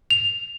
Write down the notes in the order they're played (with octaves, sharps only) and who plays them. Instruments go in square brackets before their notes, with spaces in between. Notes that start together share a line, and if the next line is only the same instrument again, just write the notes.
[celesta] F7